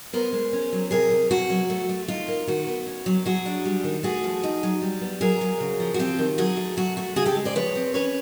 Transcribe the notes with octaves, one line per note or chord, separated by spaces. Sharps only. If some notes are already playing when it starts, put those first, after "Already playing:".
B3 A#4 C5
G#3
C#4
F#3
C3 G#4 A#4
C3
B2 F#4
F#3
A3
A3
D#4 F4
A#3
D#3 F#4
B3
C#4
F#3
F#3 F#4 G#4
D4
G3
D#3
A3 F#4 G#4
F3
D#4
F#3
G3
B3
F#3 G#4 A#4
F#3
C#3
F3
F#4
C4 F4 G4
D#3
F#3 F#4 G#4
A3
F#3 F#4
A3 F#4
C#3 F#4 G#4
G4 A4
G#3
C5 D5
F3 B4 C#5
C4
C#4 B4 C#5